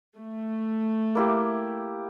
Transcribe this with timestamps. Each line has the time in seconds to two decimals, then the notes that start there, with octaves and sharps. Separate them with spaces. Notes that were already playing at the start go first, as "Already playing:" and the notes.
0.17 A3
1.15 A#3 E4 G4